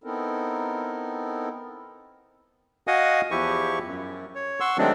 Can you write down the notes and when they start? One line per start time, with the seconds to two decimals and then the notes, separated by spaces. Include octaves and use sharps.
0.04 B3 C4 D#4 E4 A4 A#4
2.87 F#4 D#5 F5 F#5 G#5 D#6
3.31 E2 F3 E4 G4 C#6
3.86 F#2
4.35 C#5
4.60 F#5 C6 C#6 E6
4.78 D#3 F#3 G#3 A3 C4 D4